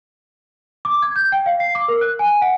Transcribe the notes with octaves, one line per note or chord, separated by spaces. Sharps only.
D6
G#6
G6
G5
F5
C7
D6
A#4
F#6
G#5
F#5